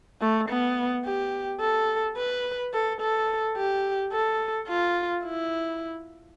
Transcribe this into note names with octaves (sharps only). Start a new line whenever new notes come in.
A3
B3
G4
A4
B4
A4
A4
G4
A4
F4
E4